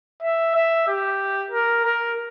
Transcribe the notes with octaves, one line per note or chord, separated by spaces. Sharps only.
E5
E5
G4
A#4
A#4